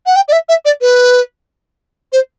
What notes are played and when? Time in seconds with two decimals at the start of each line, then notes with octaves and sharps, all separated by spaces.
0.06 F#5
0.16 G5
0.28 D5
0.32 E5
0.48 E5
0.65 D5
0.81 B4
2.12 C5